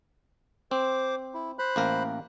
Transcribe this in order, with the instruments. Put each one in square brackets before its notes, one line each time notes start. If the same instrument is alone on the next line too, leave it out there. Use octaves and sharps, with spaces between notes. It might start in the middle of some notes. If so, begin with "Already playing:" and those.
[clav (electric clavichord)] C4 [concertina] C5 D6
[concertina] E4
C5 B5 F#6
[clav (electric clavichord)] A1 A#3 A#4